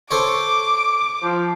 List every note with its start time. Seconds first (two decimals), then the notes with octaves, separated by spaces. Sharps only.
0.11 A4 C5 C#5 D6
1.23 F3